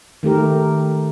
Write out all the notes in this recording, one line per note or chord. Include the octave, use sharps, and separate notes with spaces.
D#3 A3 G4 A#4